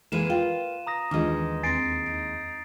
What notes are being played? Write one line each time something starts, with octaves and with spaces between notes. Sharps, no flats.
E3 G#3 A#3 A#4 B4 F#5 D#7 E7
F4 G5
A#5 D#6 A#6
D#2 D#3 E3 G#3 D4 D#4 F4 D#5
E2 C4 A6 A#6 C7 D7
D#4 D7